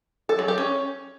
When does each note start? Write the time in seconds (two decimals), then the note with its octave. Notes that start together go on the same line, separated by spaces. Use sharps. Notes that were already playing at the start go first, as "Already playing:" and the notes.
0.29 A4
0.39 F#3
0.48 G4
0.58 C#4